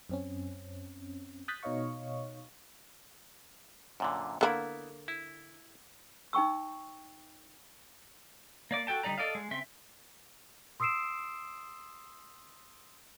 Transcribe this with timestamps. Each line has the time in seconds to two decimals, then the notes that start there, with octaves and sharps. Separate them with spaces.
0.09 F#2 C4 C#4
1.48 D#6 F#6 G6 A6 B6
1.63 B2 D#4 C#5 D#5 F5 C#6
4.00 F#2 A#2 D3
4.41 D3 A#3 B3 E4 B5
5.08 E4
6.33 D#4 G5 C#6 E6
8.71 A#3 D5 D6
8.87 F#4 A4 G5 A5
9.03 D3 G3 D#4 D5 A#5
9.18 A4 D5 D#5 F5
9.35 G#3
9.51 C#3 C4 E5 C6
10.80 C6 D#6 E6 C7 D7 E7